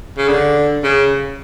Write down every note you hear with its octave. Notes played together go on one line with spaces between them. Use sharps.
C#3
D3
C#3